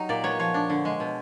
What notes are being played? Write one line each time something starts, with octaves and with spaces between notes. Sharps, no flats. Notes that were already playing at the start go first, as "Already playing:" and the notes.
Already playing: F#3 G3 D#4
A#2 D5
B3 C#5
F3 C#5
D4
D3
G#3
B2